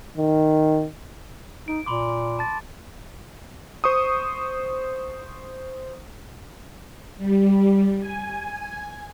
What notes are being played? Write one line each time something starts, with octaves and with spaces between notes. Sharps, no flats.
D#3
D#4 D7
A#2 B5 C6 D6
A5 A6
C5 C#6 D#6
G3
G#5